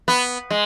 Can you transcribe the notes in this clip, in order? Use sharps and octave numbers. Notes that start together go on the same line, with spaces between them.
B3
G#3